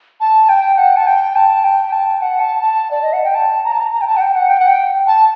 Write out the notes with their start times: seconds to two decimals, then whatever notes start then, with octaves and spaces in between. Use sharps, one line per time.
0.21 A5
0.49 G5
0.78 F#5
0.97 A5
1.07 G5
1.36 A5
1.64 G5
1.92 A5
2.21 F#5
2.40 A5
2.59 A5
2.91 D5
3.02 D#5
3.13 F#5
3.24 G5
3.35 A5
3.64 A#5
3.72 A5
3.80 A#5
3.92 A#5
4.01 G5
4.07 A5
4.17 F#5
4.21 G5
4.35 F#5
4.49 G5
4.60 F#5
4.68 G5
5.07 A5